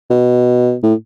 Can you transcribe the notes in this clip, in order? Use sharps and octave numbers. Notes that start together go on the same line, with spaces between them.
B2
A2